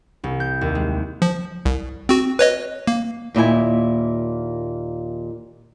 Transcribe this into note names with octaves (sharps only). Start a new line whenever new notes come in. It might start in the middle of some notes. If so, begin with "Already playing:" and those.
C2
G6
D#2
G#3
F3
C2
C4 F#4
B4 C#5 D#5
A#3
D#2 A#2 E4 G#5